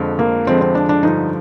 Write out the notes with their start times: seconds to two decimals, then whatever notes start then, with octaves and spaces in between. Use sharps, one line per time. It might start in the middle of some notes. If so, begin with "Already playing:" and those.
Already playing: F2 D3 F3 G#3
0.19 A#3
0.47 F2 D3 F3 G#3 C4
0.61 C4
0.75 D4
0.89 D4
1.03 G2 D3 F3 D#4